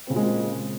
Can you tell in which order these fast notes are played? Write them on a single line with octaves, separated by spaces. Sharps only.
C4 C#3 A#2 G#3